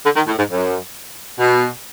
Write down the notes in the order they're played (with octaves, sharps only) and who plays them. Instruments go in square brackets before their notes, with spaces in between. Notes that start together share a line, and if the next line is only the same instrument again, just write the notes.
[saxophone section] D3
D#3
A2
G#2
F#2
B2